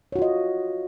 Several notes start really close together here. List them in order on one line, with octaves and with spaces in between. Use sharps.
C#5 F#4 F4 D#5